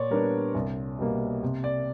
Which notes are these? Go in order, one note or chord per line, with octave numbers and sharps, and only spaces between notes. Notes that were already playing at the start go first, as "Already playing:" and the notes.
Already playing: A#2 C#5 D5
G3 B3 D4 A#4
C2
B2 G3 A#3
C3
D5